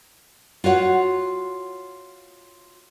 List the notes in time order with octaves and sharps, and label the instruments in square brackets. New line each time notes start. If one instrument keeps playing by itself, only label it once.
[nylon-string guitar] F4 F#4 C#5 F#5